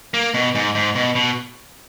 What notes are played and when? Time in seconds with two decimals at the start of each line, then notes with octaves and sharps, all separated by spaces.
0.14 A#3
0.34 B2
0.55 G#2
0.75 G#2
0.95 B2
1.15 B2